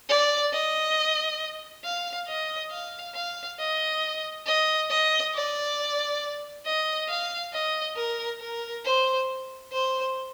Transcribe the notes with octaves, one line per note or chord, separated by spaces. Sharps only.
D5
D#5
F5
D#5
F5
F5
D#5
D#5
D#5
D5
D#5
F5
D#5
A#4
A#4
C5
C5